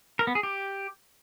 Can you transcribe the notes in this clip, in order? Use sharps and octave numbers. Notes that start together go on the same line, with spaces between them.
A#4
B3
G#4
G4